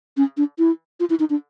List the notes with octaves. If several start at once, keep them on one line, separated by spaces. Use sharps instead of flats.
C#4
D4
E4
F4
E4
D#4
D4